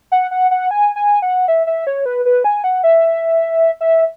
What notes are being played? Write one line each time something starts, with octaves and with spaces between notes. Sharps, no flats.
F#5
F#5
F#5
G#5
G#5
F#5
E5
E5
C#5
B4
B4
G#5
F#5
E5
E5